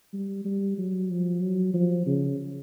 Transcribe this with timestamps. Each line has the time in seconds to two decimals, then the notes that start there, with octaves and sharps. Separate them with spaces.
0.13 G3
0.45 G3
0.78 F#3
1.10 F3
1.42 F#3
1.74 F3
2.07 C#3